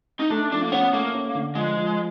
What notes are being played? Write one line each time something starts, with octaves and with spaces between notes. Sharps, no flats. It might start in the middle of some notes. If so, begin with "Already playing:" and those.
D#4
A3 D4
F3 D4
A#3
B3 C#4
A3 A#3
C#4
D3
F3 G#3
F3